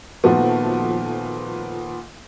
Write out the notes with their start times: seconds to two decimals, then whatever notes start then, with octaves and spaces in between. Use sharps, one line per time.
0.24 A#2 D#3 F3 A3 B3 F#4